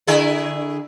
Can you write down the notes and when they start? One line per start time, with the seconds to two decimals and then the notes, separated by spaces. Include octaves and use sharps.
0.07 D3 E4 G#4